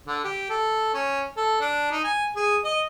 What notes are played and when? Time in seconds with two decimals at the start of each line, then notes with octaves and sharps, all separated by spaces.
0.07 D3
0.24 G4
0.50 A4
0.94 C#4
1.37 A4
1.61 D4
1.92 D#4
2.04 G#5
2.36 G#4
2.65 D#5